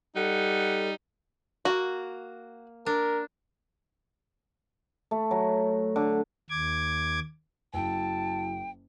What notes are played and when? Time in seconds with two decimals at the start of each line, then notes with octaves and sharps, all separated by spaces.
0.16 G3 D#4 A4 F#5
1.65 A#3 F#4
2.86 D4 A#4
5.11 A3
5.31 F#3
5.96 D3
6.50 D#2 D6 G#6
7.74 F#1 F#3 E4 F#4 G5 A5